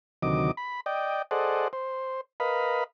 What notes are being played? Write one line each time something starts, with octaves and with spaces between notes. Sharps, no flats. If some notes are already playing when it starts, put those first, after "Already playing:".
D2 C3 D#3 F#3 D#5 D6
B5
D5 D#5 G5
G#4 A4 C5 D5 D#5 F#5
C5
A#4 B4 D#5 F5 B5